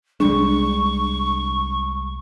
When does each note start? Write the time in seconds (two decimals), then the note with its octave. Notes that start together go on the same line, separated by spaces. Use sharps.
0.20 C2 G3 G#3 D4 C#6